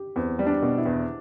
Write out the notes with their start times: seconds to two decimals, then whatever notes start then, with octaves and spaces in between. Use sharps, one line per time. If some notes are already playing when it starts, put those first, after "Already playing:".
Already playing: G4
0.16 E2 C4
0.39 G3
0.47 D4
0.62 B2
0.78 E4
0.86 E2